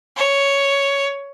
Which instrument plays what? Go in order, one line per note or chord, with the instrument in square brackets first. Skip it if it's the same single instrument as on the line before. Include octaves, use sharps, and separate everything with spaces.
[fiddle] C#5